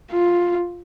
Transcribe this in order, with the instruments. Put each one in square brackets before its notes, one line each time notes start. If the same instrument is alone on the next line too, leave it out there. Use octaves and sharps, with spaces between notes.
[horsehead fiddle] F4